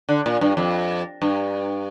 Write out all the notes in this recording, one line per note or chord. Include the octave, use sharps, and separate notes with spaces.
D3
A#2
G2
F2
G2